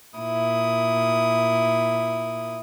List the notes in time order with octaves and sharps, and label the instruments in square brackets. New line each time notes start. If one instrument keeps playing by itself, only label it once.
[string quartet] A#2 E4 D#6